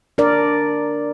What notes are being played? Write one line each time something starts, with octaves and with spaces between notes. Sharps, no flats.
D4 A#4 D5